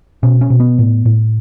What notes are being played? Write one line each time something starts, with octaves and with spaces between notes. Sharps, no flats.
B2 C#4
C#4
B2
B3
A2
A2